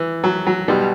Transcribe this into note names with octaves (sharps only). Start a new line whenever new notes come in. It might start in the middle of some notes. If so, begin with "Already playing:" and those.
Already playing: E3
F#3
F#3
B1 B2 G3